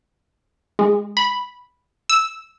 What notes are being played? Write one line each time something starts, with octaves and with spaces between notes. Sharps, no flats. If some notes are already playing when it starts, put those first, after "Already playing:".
G#3
B5
E6